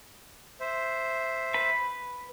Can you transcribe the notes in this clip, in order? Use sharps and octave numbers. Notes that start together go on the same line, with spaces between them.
C5 E5
B4 B5